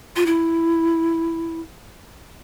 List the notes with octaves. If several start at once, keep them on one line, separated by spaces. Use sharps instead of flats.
F4
E4